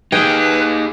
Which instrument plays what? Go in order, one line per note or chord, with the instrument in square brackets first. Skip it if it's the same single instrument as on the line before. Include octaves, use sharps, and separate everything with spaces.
[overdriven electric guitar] D#4 G4 [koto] G#4 G5 [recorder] B4